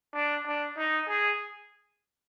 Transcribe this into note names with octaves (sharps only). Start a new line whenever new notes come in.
D4
D4
D#4
G#4